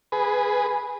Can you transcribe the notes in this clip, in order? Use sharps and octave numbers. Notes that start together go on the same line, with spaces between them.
G#4 B4